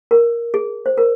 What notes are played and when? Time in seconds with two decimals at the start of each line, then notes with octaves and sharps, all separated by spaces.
0.11 A#4
0.54 G#4
0.86 C5
0.98 A#4